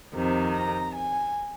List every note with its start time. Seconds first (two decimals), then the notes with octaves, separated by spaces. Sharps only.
0.15 F2 C3 D#3
0.55 A#5
0.94 G#5